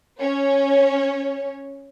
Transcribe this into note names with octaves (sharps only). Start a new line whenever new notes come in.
C#4 C#5